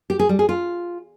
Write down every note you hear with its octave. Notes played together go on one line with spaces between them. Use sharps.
G4
G#4
G3
G#4
F4